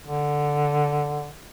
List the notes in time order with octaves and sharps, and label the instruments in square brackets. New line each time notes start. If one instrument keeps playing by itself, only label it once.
[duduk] D3